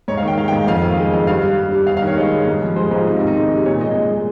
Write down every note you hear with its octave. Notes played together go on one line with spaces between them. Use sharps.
G#2 C#5
F5
D#3
G5
G#3 F5
G5
G#2
F2 F5
D#3
G#3
F2
G2 F5
G3
G2
G3
G2 F5
F5
D#3 C#5
G#3 C#5
G2
G#2
F3
G#3 C5
G#4
G#2
F4
C3 D#4
C4
D#3
D#4
G#3
C3
A#2 C#5
G#3 D#5
A#2
G#3